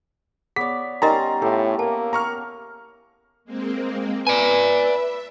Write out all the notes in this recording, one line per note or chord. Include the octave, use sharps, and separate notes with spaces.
B3 G#4 C#5 D5 B6
G3 C#4 D#4 A#4 D#5 A#5 C6 A6
A2 G4 A4 F5
A#3 A5
A#5 C#6 F6
G#3 A#3 C4
B4 D5 E5 G#5